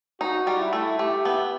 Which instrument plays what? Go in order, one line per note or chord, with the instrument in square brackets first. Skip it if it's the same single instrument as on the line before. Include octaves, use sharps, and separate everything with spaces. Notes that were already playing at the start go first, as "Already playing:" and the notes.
[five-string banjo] D#4 [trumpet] F#4
[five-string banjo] G3
[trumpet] E4
[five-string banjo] A3
[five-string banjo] A3 [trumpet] G4
[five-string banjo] B3